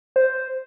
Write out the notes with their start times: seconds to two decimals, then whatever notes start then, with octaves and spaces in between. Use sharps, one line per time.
0.16 C5